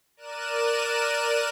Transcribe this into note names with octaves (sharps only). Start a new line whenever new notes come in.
A#4 D5 F#6 D#7 E7